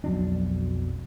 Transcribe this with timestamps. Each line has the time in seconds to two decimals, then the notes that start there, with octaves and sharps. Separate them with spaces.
0.04 B1 F2 F#3 D4